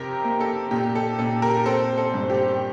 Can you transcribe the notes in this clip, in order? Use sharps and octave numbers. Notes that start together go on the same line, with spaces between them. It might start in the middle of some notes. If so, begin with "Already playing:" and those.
Already playing: F2 C3 G4 A#4
A#3
A4
A#2 G4
A4
A#2 A4
G4 A#4
C4 A4 C5
A4
G2
G4